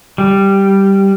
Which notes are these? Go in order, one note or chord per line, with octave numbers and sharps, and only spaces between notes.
G3